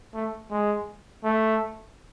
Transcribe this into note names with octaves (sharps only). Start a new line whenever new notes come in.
A3
G#3
A3